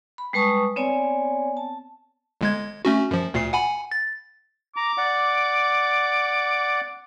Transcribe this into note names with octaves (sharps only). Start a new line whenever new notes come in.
B5
G3 G#3 B4 A5 C#6 D#6
B3 C4 C#5 D5 G#5
A5
G1 G#3 G#6
A3 C#4 F#4
F#2 F3
D2 A#2 C7
F#5 G#5 B5
A6
A#5 D6
D5 F#5